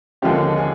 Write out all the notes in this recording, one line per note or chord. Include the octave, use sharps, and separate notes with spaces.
D#2 D3 F3 G#3 C#4 G4
G#4